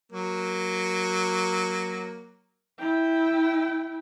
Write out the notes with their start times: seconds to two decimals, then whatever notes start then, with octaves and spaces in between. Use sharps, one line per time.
0.12 F#3 A#3
2.79 E4 G5